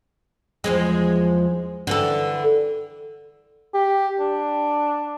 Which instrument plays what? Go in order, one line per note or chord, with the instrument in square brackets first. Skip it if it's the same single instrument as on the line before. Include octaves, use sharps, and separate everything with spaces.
[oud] E2 F3 G#3
D3 E3 A4
[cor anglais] G4
D4